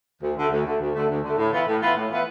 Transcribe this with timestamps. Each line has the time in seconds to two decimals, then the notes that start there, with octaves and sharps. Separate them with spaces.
0.22 D2
0.37 D3 A3
0.51 D2
0.66 D3 A3
0.80 D2
0.95 D3 A3
1.09 D2
1.24 D3 A3
1.38 A2
1.52 E3 B3 F4 B4
1.67 A2
1.81 E3 B3 F4 B4
1.96 A2
2.10 E3 B3 F4 B4